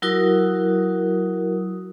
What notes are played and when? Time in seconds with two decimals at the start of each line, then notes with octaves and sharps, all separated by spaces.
0.02 F#3 E4 F#4 A#4 D#6